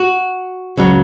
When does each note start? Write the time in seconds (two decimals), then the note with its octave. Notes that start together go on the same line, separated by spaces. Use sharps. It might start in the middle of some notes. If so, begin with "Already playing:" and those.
Already playing: F#4
0.77 C#2 C#3 F#3